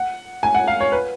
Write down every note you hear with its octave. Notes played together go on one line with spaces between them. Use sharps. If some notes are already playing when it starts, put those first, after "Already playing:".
Already playing: F#5
G#5
F#5
F5
C#5
B4